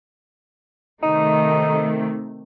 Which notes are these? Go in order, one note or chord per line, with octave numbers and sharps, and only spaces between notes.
C3 D#3 A3 D#4